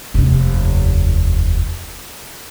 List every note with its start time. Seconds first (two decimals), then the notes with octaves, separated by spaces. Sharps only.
0.14 F1 D#2